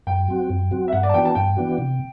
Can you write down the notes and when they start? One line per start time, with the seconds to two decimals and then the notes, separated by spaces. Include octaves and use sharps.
0.07 F#2 G5
0.28 F#3 C4 F#4
0.50 F#2
0.71 F#3 C4 F#4
0.88 E5
0.93 G2 F#5
1.03 D5
1.09 A5
1.14 E3 B3 D4 F#4 G5
1.25 A5
1.35 G2 G5
1.57 E3 B3 D4 F#4
1.78 C3